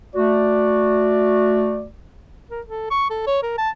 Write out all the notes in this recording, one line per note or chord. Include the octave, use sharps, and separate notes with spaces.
A3 F#4 D5
A#4
A4
C#6
A4
C#5
A#4
A5